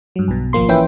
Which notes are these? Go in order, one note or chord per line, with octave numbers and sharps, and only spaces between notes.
G2 F#3
B1 B2
G#1 F3 A#3 C6
E3 C#4 B4 E5 G5